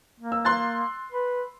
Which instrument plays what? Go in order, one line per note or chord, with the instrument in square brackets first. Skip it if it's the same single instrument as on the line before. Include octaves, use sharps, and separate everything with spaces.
[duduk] A#3
[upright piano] E6
C6 F#6 A6
[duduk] B4